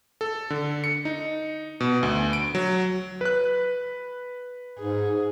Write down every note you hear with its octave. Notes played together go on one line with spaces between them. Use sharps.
A4
D3
C#7
D#4
B2
D2
D7
F#3
B4 F#6
G#2 G#4